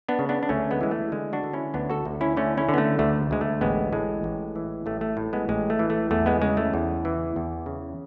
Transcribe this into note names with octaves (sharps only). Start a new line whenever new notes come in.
B3 D4
C#3
B3 D4
D4
D2 A3 C#4
G#3 B3
E3 G#3
A3
D3 G#3
D4 F#4
D3
C#4 E4
D2 B3 D4
F#4 A4
D2
C#4 E4
D3 A3 C#4
C#4 E4
D3
B3
A3
D2 A3
D2 G#3
A3
A1 G#3 B3
A2 G#3
A1
E3
A1 A3
A3
A2
G#3 B3
A1 G#3
A3
E3
A3
E2 A3
G#3 B3
C#3 G#3
A3
E2
E3
E2
C#3